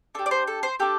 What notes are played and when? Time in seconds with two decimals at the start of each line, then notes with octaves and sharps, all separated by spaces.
0.15 D4 G4 A4
0.26 D5
0.31 C5
0.47 A4
0.63 C5
0.79 D4 G4 A4